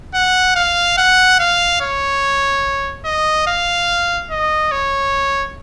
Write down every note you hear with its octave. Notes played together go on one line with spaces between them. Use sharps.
F#5
F5
F#5
F5
C#5
D#5
F5
D#5
C#5